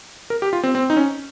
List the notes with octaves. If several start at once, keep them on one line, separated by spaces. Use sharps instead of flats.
A#4
G4
F4
C4
C4
D#4
C#4